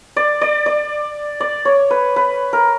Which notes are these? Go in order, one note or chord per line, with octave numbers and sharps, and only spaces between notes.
D5
D5
D5
D5
C#5
B4
B4
A#4